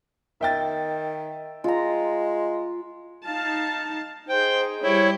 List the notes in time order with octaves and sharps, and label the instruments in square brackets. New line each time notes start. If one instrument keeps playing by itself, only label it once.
[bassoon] D#3 [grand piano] E5 G5 A6
[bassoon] G#3 [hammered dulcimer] F4 A#5
[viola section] D#4 F5 A5
[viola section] D#4 G#4 [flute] C5 [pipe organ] G5
[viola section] G3 G5 [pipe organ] E4 [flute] C#5